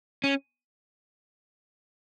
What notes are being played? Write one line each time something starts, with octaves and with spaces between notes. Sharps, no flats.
C#4